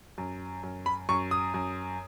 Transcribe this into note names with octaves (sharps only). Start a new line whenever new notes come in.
F#2
F#2
B5
F#2 C#6
D#6
F#2